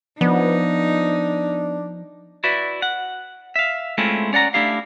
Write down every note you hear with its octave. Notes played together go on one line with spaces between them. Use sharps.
F3 B3 D4 D#4
E4 F#4 B4 D5 E5
F#5
E5 F5
G#3 A3 C4 C#4 E4 F4
C#4 D5 F#5 A#5
A3 D4 E4 G4 F5